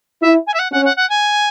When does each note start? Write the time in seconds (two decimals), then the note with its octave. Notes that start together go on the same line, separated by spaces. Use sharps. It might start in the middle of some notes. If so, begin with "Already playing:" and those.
0.22 E4 E5
0.47 G#5
0.54 E5
0.59 F#5
0.72 C#4 F#5
0.85 F#5
0.97 F#5
1.10 G#5